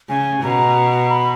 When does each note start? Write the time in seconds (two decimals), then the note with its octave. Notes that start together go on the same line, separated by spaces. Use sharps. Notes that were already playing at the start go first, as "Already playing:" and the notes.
0.09 C#3 G#5
0.43 B2 A#5
1.10 B5